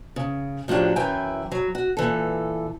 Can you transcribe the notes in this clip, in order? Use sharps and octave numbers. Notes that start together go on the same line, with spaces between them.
C#3
A2 F3 F#3 D4 G4
F#2 E3 E4 G5 G#5
F#3
F#4
A#2 E3 A4